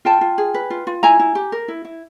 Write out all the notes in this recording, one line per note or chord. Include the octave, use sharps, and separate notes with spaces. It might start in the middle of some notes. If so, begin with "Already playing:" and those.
F4 G5 A5
F4
G#4
B4
F4
F4
E4 G#5 A#5
E4
G4
A#4
E4
E4